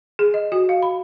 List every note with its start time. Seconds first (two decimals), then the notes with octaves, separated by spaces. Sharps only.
0.19 G#4
0.34 D#5
0.52 F#4
0.69 F5
0.83 B5